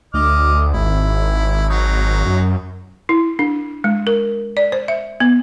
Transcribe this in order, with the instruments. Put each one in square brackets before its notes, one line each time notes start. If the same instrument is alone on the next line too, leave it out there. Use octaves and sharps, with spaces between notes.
[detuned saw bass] D2 [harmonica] D#5 D6 F6
[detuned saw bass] G#1 [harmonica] E4
[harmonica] F#3 D#4
[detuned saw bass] F#2
[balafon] E4
D4
G#3
A#4
D5
C5
E5
B3